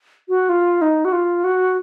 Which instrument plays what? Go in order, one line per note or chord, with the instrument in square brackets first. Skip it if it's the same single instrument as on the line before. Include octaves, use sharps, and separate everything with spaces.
[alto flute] F#4
F4
D#4
F#4
F4
F#4